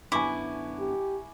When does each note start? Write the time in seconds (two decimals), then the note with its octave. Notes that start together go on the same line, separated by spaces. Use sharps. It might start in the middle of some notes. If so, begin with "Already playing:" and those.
0.12 F#2 D3 B3 E4 G#5 C#6 D6
0.80 G4